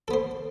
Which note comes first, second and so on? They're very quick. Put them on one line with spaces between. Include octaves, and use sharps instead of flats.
A4 B3 C5